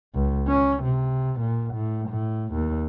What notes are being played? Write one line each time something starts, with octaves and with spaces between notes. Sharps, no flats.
C#2
C#4
C3
A#2
A2
A2
D#2